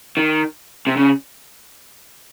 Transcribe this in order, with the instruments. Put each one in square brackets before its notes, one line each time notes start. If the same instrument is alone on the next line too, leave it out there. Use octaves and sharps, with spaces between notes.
[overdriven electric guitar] D#3
C3
C#3